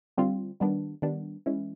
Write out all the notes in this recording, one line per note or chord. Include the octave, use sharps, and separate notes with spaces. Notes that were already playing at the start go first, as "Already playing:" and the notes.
D3 G3 C4 F4
D#3 G3 B3 D4
D#3 G3 B3 D4
E3 G#3 C#4 E4